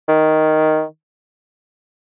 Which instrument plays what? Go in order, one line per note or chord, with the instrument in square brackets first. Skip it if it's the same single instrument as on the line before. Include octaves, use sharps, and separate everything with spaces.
[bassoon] D#3